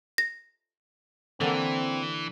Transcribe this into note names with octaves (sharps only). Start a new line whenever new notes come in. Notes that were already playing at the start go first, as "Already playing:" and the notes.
A#6
D3 E3 A#3 C4